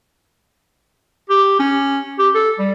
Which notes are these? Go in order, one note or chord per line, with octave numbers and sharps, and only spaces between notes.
G4
C#4
G4
A4
G3